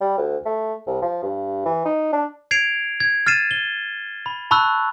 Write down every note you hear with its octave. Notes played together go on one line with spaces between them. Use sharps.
G3
D2
A3
C2
F3
G2
E3
D#4
D4
G#6 C7 D7 F7
G#6
F6 A6 C7 D#7 E7
G7
B5
A5 B5 C#6 E6 F#6